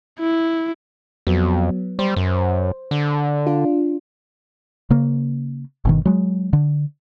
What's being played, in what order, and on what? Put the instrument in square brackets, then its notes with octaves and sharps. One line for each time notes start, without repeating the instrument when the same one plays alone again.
[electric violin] E4
[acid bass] F2 [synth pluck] F#3 B3
[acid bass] G3 [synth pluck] C5
[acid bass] F#2
D3
[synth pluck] D4 F4
[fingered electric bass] C#3 A#3
G1 B2 D#3
F#3 G#3
D3